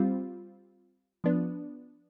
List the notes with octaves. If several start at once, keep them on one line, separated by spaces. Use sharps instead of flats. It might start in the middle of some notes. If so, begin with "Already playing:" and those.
Already playing: G3 C4 F4
F3 B3 D4